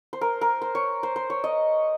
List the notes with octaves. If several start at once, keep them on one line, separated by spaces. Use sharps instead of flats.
C5
A#4
A#4
C5
C#5
C5
C5
C#5
D#5